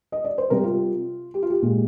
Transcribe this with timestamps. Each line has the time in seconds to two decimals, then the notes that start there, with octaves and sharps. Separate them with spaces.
0.12 D#5
0.24 D5
0.38 C5
0.50 C3 G3 A#4
0.57 G4
0.64 F4
1.34 G4
1.43 F4
1.50 G4
1.62 A#2 G#3